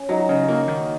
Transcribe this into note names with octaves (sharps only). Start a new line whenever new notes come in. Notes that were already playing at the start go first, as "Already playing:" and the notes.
Already playing: C#4
F#3 D#4
F#4
C#3 D#4
A#3 F#4
D#3